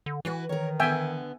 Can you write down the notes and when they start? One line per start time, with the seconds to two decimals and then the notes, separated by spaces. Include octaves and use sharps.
0.06 D3
0.25 E3 E4 F#4 B4
0.49 D#3 A#4 C#5
0.80 D3 B3 E5 G5 G#5